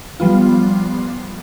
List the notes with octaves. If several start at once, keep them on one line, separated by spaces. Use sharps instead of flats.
F3 G3 B3 F4